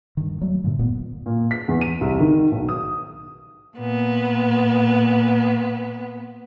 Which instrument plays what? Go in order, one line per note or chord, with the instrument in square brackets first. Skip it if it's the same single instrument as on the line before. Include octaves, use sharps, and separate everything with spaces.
[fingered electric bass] G2 D#3
F#3 G3 A3
G2 A#2 D3 A3
F1 A#2 A#3 B3
[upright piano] A#2
B6
E2
D#7
C2
D#3
B1
D#6
[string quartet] A#2 B3